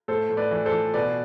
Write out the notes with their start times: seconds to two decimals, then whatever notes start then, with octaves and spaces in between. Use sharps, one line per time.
0.08 A2 A4 C5
0.29 A2
0.37 B4 D5
0.51 E3
0.66 A4 C5
0.72 E3
0.94 B2 B4 D5